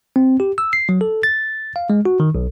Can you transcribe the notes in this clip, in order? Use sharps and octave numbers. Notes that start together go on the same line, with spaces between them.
C4
G4
E6
C7
F#3
A4
A6
F5
G#3
F#4
D#3
B1